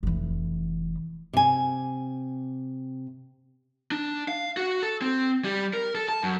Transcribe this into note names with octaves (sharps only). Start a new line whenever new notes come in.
F1 E3
C3 G#5
D4
F5
F#4
A4
C4
G3
A#4
A4
A5
F#2